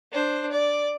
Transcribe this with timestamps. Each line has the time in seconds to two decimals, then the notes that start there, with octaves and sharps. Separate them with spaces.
0.12 D4 C5
0.52 D5